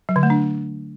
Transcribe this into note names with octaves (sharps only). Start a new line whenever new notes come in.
F#3
D3
A3
D4